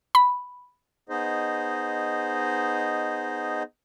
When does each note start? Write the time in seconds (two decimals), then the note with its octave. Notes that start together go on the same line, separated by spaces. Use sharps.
0.15 B5
1.09 B3 D#4 G#4 C5 D#5